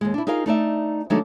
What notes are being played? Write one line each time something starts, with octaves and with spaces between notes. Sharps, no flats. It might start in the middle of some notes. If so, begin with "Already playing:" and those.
D#2 G#3
D4 E4
D#4 F4 G#4 A#4 F5
A3 D#4 D5 E5
D#3 F#3 G#3 A3 D4 D#4